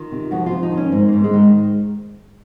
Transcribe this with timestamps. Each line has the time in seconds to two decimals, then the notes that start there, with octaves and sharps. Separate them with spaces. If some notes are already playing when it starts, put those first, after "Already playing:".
Already playing: D#3 F4
0.12 C3
0.31 F2 F#4
0.46 F4
0.52 F2
0.63 D#4
0.72 D#3
0.77 C#4
0.92 G#2 C4
1.08 G#2 A#3
1.24 G#3
1.33 D#3